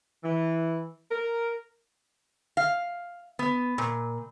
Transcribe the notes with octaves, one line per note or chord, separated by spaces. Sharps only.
E3
A#4
F5
B3
A#2